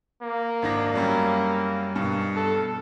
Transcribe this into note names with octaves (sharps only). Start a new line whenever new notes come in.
A#3
G#1 D4 A#6
F#2 F#3 G3
G2 B2
A4